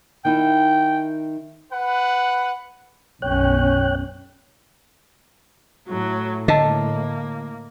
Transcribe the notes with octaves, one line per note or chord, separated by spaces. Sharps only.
D#3 D#4 E4 G5
B4 F#5
B1 F#2 C#4 C#5 G5 F#6
A2 F#3
D3 A#3 D#5 A5